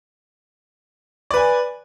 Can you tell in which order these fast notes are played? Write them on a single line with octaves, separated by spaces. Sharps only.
D5 B4 G#5